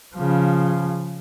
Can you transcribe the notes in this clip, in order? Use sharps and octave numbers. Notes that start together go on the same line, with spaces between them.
C#3 F3